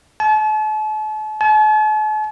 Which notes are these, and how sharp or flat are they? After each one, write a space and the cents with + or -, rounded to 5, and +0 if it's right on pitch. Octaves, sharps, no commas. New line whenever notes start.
A5 -40
A5 -45